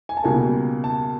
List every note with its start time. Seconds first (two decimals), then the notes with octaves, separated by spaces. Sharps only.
0.09 G#5
0.17 A5
0.24 C#2 B2 G3 A#3 G#5
0.84 A5